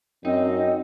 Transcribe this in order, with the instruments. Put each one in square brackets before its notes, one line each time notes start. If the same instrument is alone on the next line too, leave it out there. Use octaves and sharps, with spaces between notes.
[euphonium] F#2 [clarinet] C4 [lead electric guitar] D#4 [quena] D#5